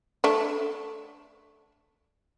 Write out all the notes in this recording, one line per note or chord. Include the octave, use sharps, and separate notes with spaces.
A3 D4